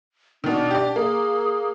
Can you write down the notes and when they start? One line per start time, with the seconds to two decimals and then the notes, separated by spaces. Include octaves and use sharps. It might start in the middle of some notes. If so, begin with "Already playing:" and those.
0.44 B2 D#3 D4
0.71 G4 D5
0.96 A#3 G#4